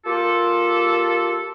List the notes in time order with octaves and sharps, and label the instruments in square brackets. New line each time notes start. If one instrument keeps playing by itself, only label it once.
[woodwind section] A#3 F4 G4 A4